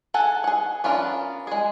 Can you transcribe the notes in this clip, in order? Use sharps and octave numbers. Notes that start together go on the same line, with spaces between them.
G#4 A4 F#5 G#5
G#4 F#5
B3 C#4 D4 F4 A#4
G#3 G#4